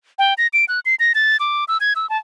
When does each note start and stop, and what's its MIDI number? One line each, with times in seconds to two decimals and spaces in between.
0.19 0.34 79
0.38 0.47 94
0.53 0.65 98
0.68 0.80 90
0.86 0.95 96
1.00 1.13 94
1.15 1.37 93
1.40 1.65 86
1.68 1.78 88
1.80 1.94 92
1.96 2.09 88
2.10 2.17 81